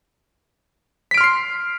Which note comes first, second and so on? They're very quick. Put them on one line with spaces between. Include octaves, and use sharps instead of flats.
B6 D7 F6 C6 C7